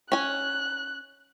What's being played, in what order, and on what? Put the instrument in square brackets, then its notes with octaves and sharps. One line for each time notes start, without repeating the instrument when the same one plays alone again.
[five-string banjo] C#4 G#5 [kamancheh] F#6